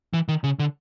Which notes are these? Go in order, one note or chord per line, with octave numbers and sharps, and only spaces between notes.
E3
D#3
C#3
D3